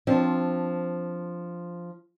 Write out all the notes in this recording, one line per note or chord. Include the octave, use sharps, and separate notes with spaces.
F3 C4 D4